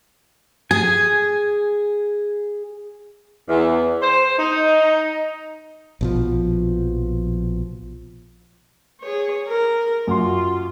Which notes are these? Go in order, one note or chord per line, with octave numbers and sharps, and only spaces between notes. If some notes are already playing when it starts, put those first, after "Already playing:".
G#4 G#5
E2
C5
D#4
A#1 B2 F3
G#4 C#5
A#4
F#2 F4 F#4 C6